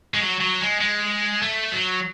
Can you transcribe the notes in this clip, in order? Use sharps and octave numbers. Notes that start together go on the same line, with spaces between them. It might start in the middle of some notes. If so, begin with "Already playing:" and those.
G#3
F#3
F#3
G#3
G#3
A3
F#3